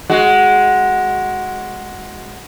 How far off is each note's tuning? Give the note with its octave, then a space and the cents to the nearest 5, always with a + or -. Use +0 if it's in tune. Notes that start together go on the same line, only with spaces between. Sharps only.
G#3 +10 F#4 +0